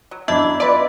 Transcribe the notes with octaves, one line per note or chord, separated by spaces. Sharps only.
F#3
F#2 F#3 B3 D4 E4 D#5 E6
F4 B4 D5